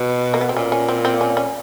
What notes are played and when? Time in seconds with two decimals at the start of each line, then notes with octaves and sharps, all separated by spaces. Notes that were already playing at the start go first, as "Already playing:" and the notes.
Already playing: B2
0.34 A#3
0.41 B3
0.49 C4
0.56 A#2 C#4
0.72 C#4
0.89 C4
1.05 C4
1.21 C#4
1.37 C#4